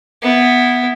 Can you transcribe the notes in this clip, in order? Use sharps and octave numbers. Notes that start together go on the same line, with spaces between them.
B3 E4